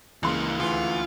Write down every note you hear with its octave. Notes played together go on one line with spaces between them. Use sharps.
C#2 E3 A#3 C6
D2 E3 F4